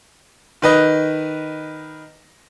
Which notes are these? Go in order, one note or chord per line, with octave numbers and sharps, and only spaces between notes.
D#3 B4 D#5